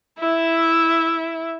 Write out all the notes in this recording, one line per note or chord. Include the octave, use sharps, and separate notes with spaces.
E4 E5